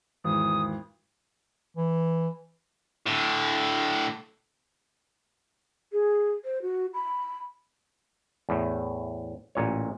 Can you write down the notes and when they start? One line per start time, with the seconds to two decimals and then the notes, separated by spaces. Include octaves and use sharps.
0.24 G#1 E2 D#6
1.77 E3
3.06 A2 D3
5.92 G#4
6.44 C5
6.62 F#4
6.94 B5
8.49 E2 A2
9.55 A1 A#2 C#5